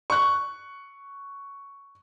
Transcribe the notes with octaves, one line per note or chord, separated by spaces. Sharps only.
C#6 F#6